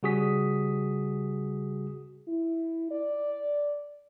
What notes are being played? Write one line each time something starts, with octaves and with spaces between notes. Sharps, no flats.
C#3 G3 F#4 G#4 D#6 B6
E4
D5